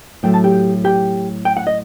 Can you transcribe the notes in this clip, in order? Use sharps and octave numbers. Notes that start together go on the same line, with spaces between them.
A2 F#3 A3 G5
A5
G4 G5
G4 G5
G5
F#5
D#5